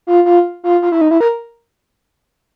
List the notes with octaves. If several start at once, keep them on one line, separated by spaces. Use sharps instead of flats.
F4
F4
F4
F4
E4
D#4
E4
A#4